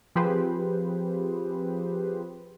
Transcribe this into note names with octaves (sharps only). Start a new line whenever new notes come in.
F3 C4 G4 G#4 B4 C5